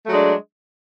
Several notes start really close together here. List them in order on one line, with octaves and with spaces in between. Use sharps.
A3 F#3 G#3 D4